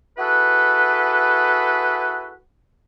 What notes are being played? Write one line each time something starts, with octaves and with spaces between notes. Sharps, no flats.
E4 F#4 G#4 A4 B4